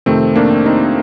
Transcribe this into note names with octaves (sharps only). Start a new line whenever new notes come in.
F2 C3 D#3 A3 C4
A#3 D4
C4 D#4